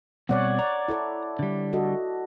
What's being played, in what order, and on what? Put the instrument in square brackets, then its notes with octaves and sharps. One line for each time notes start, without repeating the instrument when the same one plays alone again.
[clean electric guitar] B2 G3 C4 [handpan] C#5 D5 F#5
[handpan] D5 [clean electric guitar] A#5
[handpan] E4 A4 D5
[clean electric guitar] D3 G3
[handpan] F#4 A4 D#5